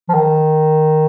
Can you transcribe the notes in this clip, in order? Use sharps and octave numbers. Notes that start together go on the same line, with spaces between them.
F3
D#3